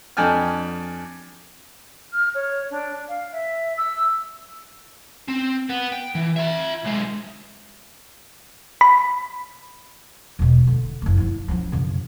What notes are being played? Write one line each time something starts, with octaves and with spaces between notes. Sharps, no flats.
F2 D4 G5 G#5 F6
F6
C#5
D4
F5
E5
E6
C4
B3
G5
E3
F4 E5
B1 G#3
B5
E1 B2
D3
F#1 A#3
F3 E4
F3 C#4
F#2 C#3